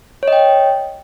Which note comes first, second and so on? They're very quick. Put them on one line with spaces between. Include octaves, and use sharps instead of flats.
C#5 D#5 G5